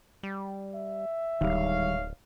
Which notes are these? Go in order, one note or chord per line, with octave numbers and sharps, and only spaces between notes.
G3
E5
D1 G#2 D#3 G3 C#5 F5